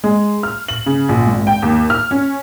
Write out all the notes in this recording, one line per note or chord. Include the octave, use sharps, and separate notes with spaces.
G#3
F6
F#7
C#3
A#1
G#1
G5
D#2
F6
C#4